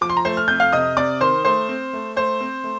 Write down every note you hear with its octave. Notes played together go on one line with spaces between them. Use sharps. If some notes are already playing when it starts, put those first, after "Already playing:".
F3 D6
C6
A#5
A3 C5 C6
F6
F2 G6
F5 F6
C3 D#5 D#6
C3 D5 D6
D#3 C5 C6
A3 C5 C6
C4
A3
A3 C5 C6
C4
A3